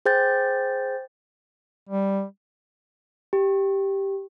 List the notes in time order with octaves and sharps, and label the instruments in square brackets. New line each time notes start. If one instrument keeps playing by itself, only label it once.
[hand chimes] G#4 C5 G5 G6 A6
[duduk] G3
[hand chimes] G4